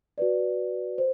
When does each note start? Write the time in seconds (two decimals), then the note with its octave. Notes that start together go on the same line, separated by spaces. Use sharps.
0.18 F#4 B4 D5
0.98 C5